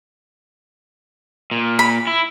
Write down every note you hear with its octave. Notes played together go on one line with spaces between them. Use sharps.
A#2
B5
E4